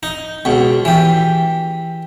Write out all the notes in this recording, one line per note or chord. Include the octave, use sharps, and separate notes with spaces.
D#4
C#2 B2
E3 G4